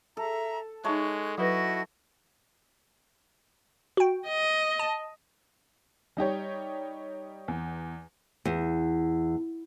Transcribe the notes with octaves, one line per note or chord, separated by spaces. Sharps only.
A4 E5 A#5
G#3 D#4 C#5 E5 A5 C#6 F#6
F#3 E4 F#4 B4 D#5
F#4 G5
D#5
A5
G3 D#4 G4 C#5
E2
E2